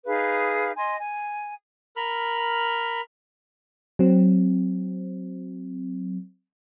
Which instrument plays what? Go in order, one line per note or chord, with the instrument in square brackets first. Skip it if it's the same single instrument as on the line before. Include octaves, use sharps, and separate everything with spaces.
[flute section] D#4 G#4 B4 F5
D#5 G#5 C6
G#5
[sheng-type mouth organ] A#4 B5 F6
[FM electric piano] F#3 C4